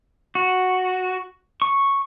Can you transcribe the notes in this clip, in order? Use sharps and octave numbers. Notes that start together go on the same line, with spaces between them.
F#4
C#6